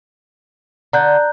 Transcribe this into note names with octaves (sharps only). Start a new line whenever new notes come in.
D3 A#5 F#6 G6